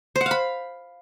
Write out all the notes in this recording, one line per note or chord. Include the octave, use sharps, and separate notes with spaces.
C5
F#5
F5
B5